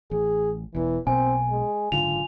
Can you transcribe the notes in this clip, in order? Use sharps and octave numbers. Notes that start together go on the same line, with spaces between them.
A1 G#4
E1 E2 E3
B1 B2 A#3 C4 G#5
G#3
F#1 G#2 D3 F4 F7